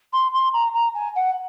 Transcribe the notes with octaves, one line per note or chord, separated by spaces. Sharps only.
C6
C6
A#5
A#5
G#5
F#5